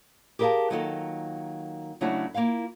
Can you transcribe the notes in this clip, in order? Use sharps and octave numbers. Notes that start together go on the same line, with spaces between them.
G4 G#4 A#4 D#5 F5 A5
D#3 F#3 A#3 D#4 F4 A4
C#3 F#3 A3 D4 E4 F#4
A#3 E4 F4 F5